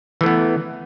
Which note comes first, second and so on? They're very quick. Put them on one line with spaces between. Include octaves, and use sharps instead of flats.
E3 A3 B3